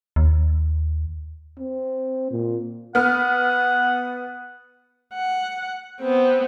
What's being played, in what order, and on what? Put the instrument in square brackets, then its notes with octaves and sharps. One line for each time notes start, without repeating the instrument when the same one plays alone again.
[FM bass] D#2
[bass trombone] C4
A#2
[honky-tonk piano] B3 F6 [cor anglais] F#5
[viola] F#5
B3 C4